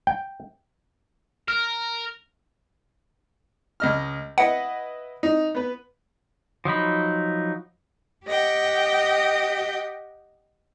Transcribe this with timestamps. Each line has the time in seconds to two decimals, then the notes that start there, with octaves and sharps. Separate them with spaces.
0.07 G5
1.48 A#4 F6
3.80 C#2 D#5 F6
4.38 E4 B4 D#5 F#5
5.23 D#4
5.55 B3 B4
6.65 F3 F#3 D#4 B5
8.25 G4 D#5 F#5 G5